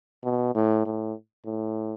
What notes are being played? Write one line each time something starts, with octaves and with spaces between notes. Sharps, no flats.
B2
A2
A2
A2